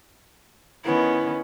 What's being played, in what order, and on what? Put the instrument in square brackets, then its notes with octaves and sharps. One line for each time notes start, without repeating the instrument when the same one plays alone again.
[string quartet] D#3 B3 C#4 [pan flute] E4